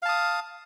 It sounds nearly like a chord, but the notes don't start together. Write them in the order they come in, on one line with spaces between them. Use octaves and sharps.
F5 A5 D#6